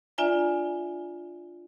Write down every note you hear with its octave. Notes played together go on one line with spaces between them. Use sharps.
D4 F4 D5 E5 G#5 A#5